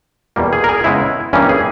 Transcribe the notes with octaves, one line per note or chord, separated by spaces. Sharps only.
E2 B2 G3 A#3
G#4
A#4
G#4
C#3 G#3 B3 E4
G2 E3 G3 A#3 C#4
G#4